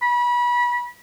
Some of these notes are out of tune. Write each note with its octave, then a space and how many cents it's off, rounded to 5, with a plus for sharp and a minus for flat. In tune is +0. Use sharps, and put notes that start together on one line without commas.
B5 -30